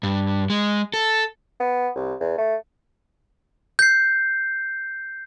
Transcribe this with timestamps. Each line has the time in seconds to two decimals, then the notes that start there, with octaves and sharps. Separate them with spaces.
0.03 G2
0.50 G#3
0.94 A4
1.60 B3
1.95 C2
2.20 E2
2.38 A3
3.79 G6 C7